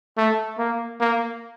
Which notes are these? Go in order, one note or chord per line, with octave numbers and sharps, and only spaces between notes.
A3
A#3
A#3